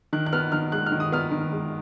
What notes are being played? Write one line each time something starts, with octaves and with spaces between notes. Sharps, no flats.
D#3 F#6
F#6
B3 F6
D#3 F6
G#3 F#6
F6
D#3
D#6
B3 F6
D#3
G#3